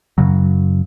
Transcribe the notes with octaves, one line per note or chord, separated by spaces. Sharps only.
F#2 C#3 F#3